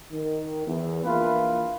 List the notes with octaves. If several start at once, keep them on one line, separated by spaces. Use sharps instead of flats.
D#3
E2
A#1 E3 A#3 F4 B4